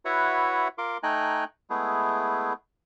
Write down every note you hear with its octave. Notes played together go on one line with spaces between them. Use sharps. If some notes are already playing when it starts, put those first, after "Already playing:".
E4 F#4 B4 C#5 E5 F#5
F4 A#4 C6 D6
A3 D#4 G5 G#5 A#5 F#6
G#3 A3 B3 E4 G#4